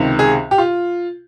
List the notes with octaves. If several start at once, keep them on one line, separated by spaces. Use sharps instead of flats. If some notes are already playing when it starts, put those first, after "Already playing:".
Already playing: C#2 C3 D#3
G#4
G4
F4